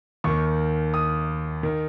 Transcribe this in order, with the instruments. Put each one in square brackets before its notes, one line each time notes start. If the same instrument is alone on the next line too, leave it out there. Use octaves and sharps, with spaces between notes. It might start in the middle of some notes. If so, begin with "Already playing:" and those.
[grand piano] D#2 D#3 C#6
D#6
D#3